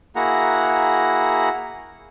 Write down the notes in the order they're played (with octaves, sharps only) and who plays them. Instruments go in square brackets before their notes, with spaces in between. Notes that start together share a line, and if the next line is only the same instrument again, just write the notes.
[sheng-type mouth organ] A#3 E4 F#4 G#4 F#5 A#5